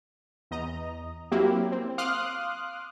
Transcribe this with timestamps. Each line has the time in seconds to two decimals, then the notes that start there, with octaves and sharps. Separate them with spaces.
0.51 E2 D#5 A#5
1.31 F#3 A#3 C4 E4 G4
1.72 C4
1.98 F5 C6 D6 D#6 F6 F#6